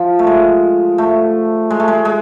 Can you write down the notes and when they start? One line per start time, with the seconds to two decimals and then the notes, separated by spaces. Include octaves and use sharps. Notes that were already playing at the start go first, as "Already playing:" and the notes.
Already playing: F3
0.19 A3
0.27 G#3
0.98 A3
1.70 G#3
1.80 A3
1.88 G#3
2.05 G#3